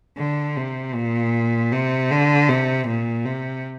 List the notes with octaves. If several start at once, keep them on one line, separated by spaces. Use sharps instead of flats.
D3
C3
A#2
C3
D3
C3
A#2
C3